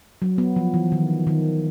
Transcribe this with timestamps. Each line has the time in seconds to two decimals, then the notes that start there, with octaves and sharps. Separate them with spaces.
0.22 F#3
0.38 B3
0.56 F3
0.74 E3
0.92 D#3
1.27 D#3